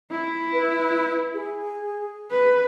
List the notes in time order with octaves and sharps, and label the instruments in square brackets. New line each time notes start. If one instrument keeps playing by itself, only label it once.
[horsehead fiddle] E4
[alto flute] B4
G#4
[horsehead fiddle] B4